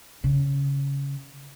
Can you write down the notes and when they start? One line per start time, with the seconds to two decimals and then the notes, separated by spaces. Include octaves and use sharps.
0.24 C#3